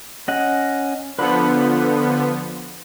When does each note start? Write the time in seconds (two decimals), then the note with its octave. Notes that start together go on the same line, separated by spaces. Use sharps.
0.28 C#4 D#5 F#5
1.19 D3 F3 B3 B4 B5